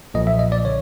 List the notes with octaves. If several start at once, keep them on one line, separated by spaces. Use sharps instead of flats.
B1 A#2 F3 D#5
E5
D#5
D5
D3 C#5